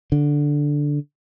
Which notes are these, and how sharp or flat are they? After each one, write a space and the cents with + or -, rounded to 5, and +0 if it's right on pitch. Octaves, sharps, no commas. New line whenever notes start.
D3 -5